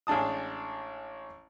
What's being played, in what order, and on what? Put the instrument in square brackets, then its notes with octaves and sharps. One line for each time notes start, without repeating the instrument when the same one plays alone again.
[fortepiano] A1 G#3 D4 A5 D#6